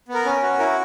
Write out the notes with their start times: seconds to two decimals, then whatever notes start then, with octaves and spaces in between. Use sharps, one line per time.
0.08 B3
0.14 A#4
0.25 C#4
0.42 F#4
0.59 E4 A#4